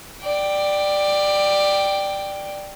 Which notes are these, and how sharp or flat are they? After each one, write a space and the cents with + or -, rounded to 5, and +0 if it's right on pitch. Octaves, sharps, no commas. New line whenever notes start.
D5 +10 G5 +0